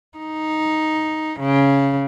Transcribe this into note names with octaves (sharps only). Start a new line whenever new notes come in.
D#4
C#3